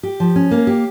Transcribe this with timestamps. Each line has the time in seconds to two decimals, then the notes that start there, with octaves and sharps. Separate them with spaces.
0.03 G4
0.20 F3
0.36 C#4
0.51 A#3
0.67 G4